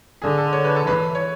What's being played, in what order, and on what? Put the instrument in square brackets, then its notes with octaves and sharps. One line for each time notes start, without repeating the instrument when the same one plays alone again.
[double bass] D3 [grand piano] G#4
[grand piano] A4
C#5
B4
A4
[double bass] E3 [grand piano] B4
[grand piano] C#5